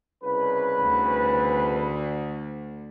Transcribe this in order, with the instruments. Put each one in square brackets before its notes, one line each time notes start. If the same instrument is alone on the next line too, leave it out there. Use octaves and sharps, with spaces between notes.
[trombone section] C2 C#3 B4
[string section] D2